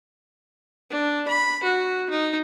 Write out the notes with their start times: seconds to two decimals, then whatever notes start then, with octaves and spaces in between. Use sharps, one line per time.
0.90 D4
1.28 B5
1.63 F#4
2.10 D#4